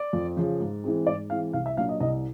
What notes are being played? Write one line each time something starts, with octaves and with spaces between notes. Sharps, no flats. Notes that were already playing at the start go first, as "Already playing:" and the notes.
Already playing: D5
F2
C#3 F3
G#2
E3 G#3 C4
G#2 D5
E3 G#3 C4 F5
C2 F5
E5
A#2 F#3 A#3 D4 F5
D#5
C2 D#5